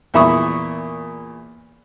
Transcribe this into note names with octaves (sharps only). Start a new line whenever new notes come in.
E2 A#2 E5 B5 C#6 D#6